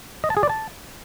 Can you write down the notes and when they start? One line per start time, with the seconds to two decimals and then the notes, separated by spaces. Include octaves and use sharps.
0.24 D#5
0.30 A5
0.37 G#4
0.43 D5
0.49 A5